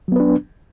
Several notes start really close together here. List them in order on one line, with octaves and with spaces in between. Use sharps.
F#3 B3 B4 D4